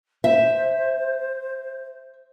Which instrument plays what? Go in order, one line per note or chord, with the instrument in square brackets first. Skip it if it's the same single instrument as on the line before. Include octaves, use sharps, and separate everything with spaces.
[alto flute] C5 [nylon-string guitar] E5